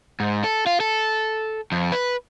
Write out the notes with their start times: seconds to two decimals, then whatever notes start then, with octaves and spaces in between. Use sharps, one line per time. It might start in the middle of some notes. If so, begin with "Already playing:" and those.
0.20 G#2
0.44 A4
0.66 F4
0.80 A4
1.72 F2
1.92 B4